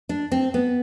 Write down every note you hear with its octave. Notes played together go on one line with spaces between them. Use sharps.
D4
C4
B3